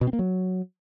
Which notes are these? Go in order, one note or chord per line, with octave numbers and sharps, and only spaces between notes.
B2
C4
A#3
F#3